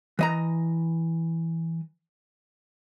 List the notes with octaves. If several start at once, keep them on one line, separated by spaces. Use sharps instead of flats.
E3 D#5 A#5